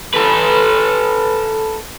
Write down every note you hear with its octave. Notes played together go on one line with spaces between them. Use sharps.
A4 B4